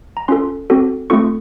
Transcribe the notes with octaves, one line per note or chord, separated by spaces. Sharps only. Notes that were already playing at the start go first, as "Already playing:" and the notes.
A#5
C#4 F4 A4 C6
C4 F#4 A4
A3 C4 F4 A4 C#6